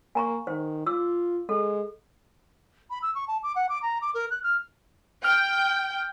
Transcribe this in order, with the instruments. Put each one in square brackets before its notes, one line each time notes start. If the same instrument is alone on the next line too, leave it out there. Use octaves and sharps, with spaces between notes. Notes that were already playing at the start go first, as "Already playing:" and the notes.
[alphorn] A#3 [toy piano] G#5 A#5 C#6
[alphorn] D#3 [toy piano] C5
[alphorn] F4 [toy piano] D6 E6
[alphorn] G#3 [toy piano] A4
[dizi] B5
E6
C#6
A5
D6
F#5
D6
A#5
D6
A#4
F#6
F6
[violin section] G5 [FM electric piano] F6